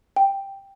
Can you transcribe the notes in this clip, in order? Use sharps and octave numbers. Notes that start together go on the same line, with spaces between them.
G5